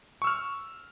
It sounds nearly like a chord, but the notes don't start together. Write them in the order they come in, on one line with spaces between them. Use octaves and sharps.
C#6 E6 F6